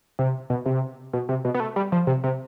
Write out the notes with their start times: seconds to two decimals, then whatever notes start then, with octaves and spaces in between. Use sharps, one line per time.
0.19 C3
0.50 B2
0.66 C3
1.13 B2
1.29 C3
1.45 B2
1.54 B3
1.60 A3
1.76 G3
1.92 F3
2.07 C3
2.24 C3